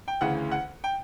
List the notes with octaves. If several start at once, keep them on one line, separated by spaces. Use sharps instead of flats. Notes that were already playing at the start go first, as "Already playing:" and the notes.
G5
D2 C#3 E3 F#5
F#5
G5